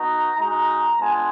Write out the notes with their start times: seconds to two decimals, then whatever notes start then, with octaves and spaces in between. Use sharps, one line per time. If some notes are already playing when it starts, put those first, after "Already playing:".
Already playing: B3 D#4 F#4 A#5
0.38 G#3 D#4 F#4 A#5
0.99 G#3 B3 D4 F4 G#5